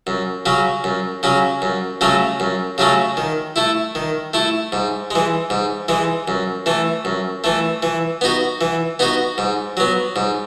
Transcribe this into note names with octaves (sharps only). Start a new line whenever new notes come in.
F#2
C#3 F#3 C#4
F#2
C#3 F#3 C#4
F#2
C#3 F#3 A3 C#4
F#2
C#3 F#3 A3 C#4
D#3
A3 E4
D#3
A3 E4
G#2
E3 G#3
G#2
E3 G#3
F#2
E3 A3
F#2
E3 A3
E3
B3 D#4 F#4
E3
B3 D#4 F#4
G#2
F#3 B3
G#2